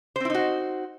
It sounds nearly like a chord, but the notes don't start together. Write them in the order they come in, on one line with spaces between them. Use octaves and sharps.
C5 C4 E4 D#4 F#4